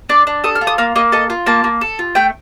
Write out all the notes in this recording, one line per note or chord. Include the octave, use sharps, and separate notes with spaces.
D4 D6
D4
A4 D#6
F6
F4
D#6
A#3 F5
A#3 D#5
A4 D#5
F4
A#3 A5
A#3
A4
F4
A3 G5